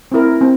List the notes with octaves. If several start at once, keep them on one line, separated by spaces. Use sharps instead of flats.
C4 E4 A#4
C4